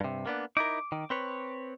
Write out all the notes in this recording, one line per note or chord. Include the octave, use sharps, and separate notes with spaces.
G2 C3
A#3 B3 D4
D#4 E4 A#4 D6
D#3
C4 B4 C#5